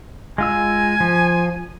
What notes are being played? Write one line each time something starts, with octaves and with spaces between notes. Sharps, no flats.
G#3 F4 G#5 E6
F3